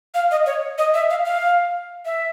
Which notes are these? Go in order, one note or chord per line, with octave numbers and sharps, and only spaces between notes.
F5
D#5
C#5
D#5
E5
F5
F5
E5